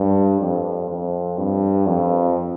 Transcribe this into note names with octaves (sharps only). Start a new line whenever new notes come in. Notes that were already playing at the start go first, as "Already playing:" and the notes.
Already playing: G2
F2
F2
G2
F2